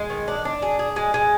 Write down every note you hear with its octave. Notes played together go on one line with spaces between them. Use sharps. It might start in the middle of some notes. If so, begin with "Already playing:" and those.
Already playing: G#3
D#3
D4
D4
G#4
G#4
G#3
G#3